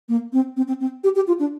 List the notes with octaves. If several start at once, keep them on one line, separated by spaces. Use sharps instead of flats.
A#3
C4
C4
C4
C4
G4
G4
F4
D4